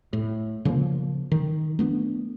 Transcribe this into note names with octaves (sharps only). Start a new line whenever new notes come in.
A2
C#3 F3 A3 A#3
D#3
A3 B3 C#4 D4